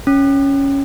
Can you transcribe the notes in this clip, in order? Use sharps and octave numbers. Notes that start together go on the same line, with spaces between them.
C#4